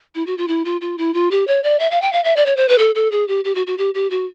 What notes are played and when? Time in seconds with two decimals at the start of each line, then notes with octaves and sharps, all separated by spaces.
0.15 E4
0.27 F#4
0.38 F4
0.48 E4
0.65 F4
0.81 F4
0.98 E4
1.14 F4
1.31 G4
1.47 C#5
1.64 D5
1.79 E5
1.91 F5
2.02 G5
2.13 F5
2.24 E5
2.37 D5
2.46 C#5
2.57 C5
2.69 B4
2.78 A4
2.95 A4
3.12 G#4
3.28 G4
3.45 G4
3.55 F#4
3.67 F#4
3.78 G4
3.94 G4
4.10 F#4